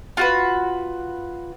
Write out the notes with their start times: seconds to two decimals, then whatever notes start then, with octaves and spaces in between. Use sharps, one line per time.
0.17 F4 F#4 B4